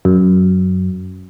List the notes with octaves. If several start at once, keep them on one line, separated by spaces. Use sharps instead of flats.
F#2